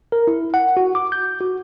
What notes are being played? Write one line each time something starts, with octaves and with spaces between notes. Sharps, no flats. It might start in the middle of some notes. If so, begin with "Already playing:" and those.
A#4
E4
F#5
F#4
D6
G6
F#4